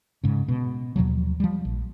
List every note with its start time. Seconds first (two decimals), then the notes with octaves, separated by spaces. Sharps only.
0.24 G#2 C#3
0.48 B2
0.96 D#2 B2 F3 F#3
1.40 F3 G3
1.65 A#1